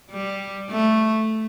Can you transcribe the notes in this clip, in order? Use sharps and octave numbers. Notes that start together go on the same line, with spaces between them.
G3
A3